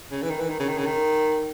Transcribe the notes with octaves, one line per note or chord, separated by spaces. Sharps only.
C#3
E3
D#3
E3
D#3
C#3
D#3
C#3
D#3